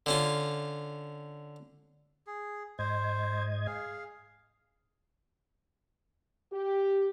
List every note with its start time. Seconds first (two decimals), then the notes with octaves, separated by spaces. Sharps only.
0.06 D3 C#4 F4
2.27 G#4
2.79 G#2 C5 D#5 G#6
3.67 G#4 F5
6.51 G4